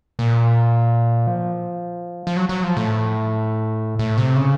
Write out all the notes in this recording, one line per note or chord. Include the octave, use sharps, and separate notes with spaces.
A#2
F3
F3
F#3
F#3
F3
A2
A2
C3
C#3